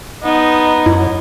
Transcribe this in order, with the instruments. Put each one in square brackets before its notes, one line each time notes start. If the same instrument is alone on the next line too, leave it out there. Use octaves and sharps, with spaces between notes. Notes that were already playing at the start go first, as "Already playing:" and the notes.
[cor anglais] B3 [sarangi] D#4
[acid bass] F#2 [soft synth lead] E4